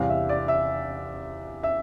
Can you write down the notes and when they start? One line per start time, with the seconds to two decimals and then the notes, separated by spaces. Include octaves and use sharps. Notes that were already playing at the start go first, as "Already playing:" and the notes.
Already playing: E2 C3 G3 F5
0.09 E5
0.29 D5
0.48 E5
1.63 E5